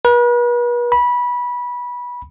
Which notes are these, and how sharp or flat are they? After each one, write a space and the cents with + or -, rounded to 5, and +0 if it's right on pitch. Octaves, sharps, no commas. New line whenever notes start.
B4 -40
B5 -20